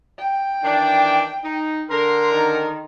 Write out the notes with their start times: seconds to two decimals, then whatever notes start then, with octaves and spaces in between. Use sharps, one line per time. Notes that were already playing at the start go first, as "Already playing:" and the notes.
0.18 G5
0.64 D#3 E3 D4
1.44 D#4
1.90 D3 A#4 C6
2.34 D#3